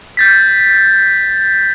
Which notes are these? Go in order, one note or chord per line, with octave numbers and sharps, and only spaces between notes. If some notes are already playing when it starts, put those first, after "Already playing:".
G6 A6 B6